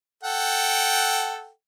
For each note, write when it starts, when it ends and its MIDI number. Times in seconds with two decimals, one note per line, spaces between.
0.24 1.49 69
0.24 1.49 78
0.24 1.49 79